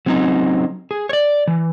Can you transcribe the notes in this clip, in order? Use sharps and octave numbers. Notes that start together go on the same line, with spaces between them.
F#3 C4 C#4 D#4
G#4
C#5 D5
E3